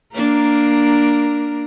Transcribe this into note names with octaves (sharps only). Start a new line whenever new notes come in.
A#3 D4 A#4